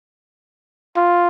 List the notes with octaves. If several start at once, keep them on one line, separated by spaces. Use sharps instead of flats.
F4